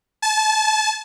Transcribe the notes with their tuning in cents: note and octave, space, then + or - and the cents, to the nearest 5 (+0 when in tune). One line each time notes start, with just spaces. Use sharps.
A5 -30